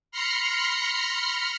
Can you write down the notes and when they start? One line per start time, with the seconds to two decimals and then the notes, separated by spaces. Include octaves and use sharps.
0.12 B5 C6 F6 A#6 C7 C#7